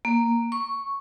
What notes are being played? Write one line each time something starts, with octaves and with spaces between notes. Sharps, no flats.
A#3
C#6